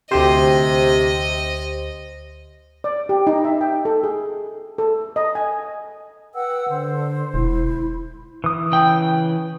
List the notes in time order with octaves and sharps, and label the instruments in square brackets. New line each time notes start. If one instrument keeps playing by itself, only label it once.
[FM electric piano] D2 G4 C5 [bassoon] C3 [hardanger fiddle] D#5
[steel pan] D5
G4
D#4
E5
G5
A4
G#4
A4
D#5
G#5
[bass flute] B4 [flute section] F#5 G5 E6
[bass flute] D3 [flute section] C5
[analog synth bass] E1 [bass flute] E4
[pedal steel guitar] E3 D#6
[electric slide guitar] C#3 G5